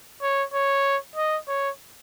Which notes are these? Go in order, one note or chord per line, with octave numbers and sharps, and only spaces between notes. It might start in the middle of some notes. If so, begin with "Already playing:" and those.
C#5
C#5
D#5
C#5